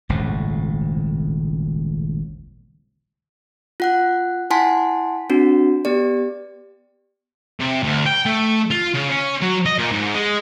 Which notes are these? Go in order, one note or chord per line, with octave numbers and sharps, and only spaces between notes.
D#1 G#1 C#2 A2
F4 F#5 F#6
E4 F#5 G#5 A5 C6 B6
C4 D4 F#4
B3 G4 D5
C3
D2
G5
A3
F4
C#3
C#4
F#3
D#5
A#2
G#2
G#3